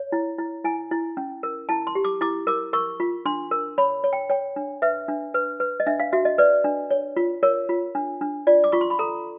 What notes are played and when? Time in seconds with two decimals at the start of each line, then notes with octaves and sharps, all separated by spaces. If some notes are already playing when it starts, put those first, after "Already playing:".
Already playing: C#5
0.12 E4
0.38 E4
0.65 E4 G#5
0.91 E4
1.17 C#4
1.43 A#4
1.69 E4 A5
1.87 C6
1.95 G4
2.05 D6
2.21 E4 D6
2.47 A#4 D6
2.73 A#4 C#6
3.00 F4
3.26 D4 C6
3.51 A#4
3.78 C#5 B5
4.04 C#5
4.13 G5
4.30 C#5 G5
4.56 D4
4.82 B4 E5
5.08 D4
5.34 B4
5.60 B4
5.80 D#5
5.86 D4 E5
6.00 F5
6.13 F#4 E5
6.25 D#5
6.38 B4 D5
6.64 D4
6.91 C#5
7.17 F4
7.43 A#4 C#5
7.69 F4
7.95 D4
8.21 D4
8.47 F4 D5
8.64 D6
8.72 F4 C#6
8.81 C6
8.90 B5
8.99 A4 A#5